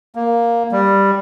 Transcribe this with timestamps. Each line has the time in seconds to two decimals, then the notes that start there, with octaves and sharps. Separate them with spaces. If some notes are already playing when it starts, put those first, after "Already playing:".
0.15 A#3
0.72 G3